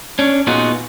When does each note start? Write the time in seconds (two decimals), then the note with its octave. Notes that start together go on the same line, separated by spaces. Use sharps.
0.19 C#4 D4
0.47 A#2 B3 D#4 F4 F#4 G#4